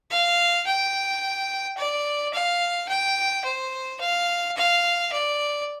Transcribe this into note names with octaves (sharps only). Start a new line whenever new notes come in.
F5
G5
D5
F5
G5
C5
F5
F5
D5